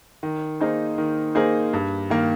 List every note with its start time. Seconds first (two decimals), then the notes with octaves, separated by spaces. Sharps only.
0.23 D#3
0.60 A#3 D#4 G#4 C5
0.98 D#3
1.35 A#3 D#4 G#4 C5
1.73 G2
2.10 D#3 A#3